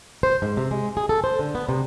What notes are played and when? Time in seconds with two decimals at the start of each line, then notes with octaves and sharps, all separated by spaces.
0.23 C5
0.42 G#2
0.57 C3
0.71 G#3
0.97 G#4
1.09 A4
1.24 C5
1.39 D3
1.55 B3
1.69 C3